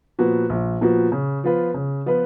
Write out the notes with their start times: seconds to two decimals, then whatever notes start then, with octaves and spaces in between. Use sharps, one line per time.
0.19 A#2 F3 B3 F#4
0.50 A#1
0.81 A#2 F3 B3 F#4
1.12 C#3
1.44 F3 B3 F4 B4
1.74 C#3
2.06 F3 B3 F4 B4